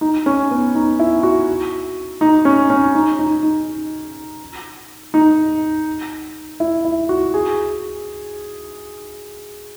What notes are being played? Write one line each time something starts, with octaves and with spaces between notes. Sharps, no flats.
D#4
C#4
B3
D#4
E4
F#4
D#4
C#4
C#4
D#4
D#4
D#4
D#4
E4
E4
F#4
G#4